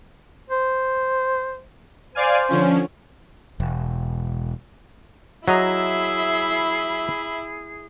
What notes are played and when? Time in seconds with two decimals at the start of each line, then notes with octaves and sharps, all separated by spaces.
0.50 C5
2.15 C5 D5 F5 G#5
2.49 D3 F3 C#4
3.60 E1
5.48 F#3 E4 G#4 D#5 E5 A#5 B5